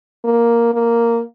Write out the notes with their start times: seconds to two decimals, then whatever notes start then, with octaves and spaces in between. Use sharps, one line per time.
0.24 A#3
0.74 A#3